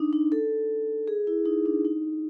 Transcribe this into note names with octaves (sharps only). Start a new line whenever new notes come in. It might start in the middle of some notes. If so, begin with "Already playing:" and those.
Already playing: D4 D#4
D#4
A4
G#4
E4
D#4
D4
D#4